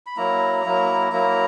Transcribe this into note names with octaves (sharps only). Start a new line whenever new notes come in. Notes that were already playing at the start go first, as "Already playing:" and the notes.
B5
F#3 A#3 E4 A#5
F#3 A#3 E4
F#3 A#3 E4 A#5